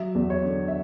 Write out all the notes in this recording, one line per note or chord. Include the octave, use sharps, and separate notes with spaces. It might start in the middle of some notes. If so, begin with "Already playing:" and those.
Already playing: F#3 E5
E2
C#5
D3
E5